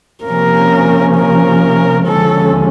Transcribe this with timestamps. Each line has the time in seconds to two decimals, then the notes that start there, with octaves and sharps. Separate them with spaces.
0.24 C3 F3 A#3 C#4 A#4
1.15 A#4
2.07 D#2 D3 F3 G#3 C#4 A4